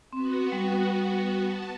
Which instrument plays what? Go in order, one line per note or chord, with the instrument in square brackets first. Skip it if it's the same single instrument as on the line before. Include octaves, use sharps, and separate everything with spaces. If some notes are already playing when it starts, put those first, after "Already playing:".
[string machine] B3 F#4 [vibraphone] C4
[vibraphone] G3
[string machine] A5